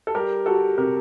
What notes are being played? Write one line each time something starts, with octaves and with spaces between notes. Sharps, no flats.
A4
G3 G4 A#4
G3 F#4 A4
C3 G4 A#4